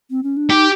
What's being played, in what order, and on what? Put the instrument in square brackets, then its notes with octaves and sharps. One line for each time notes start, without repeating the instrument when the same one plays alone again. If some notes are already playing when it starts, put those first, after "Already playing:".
[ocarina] C4
C#4
D4
[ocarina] D#4 [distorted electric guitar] G4